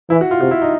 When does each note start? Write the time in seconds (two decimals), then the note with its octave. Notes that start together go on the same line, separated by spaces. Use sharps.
0.10 E3 E4
0.21 F#4
0.31 F4
0.41 C3 F#4
0.51 E4
0.61 D#4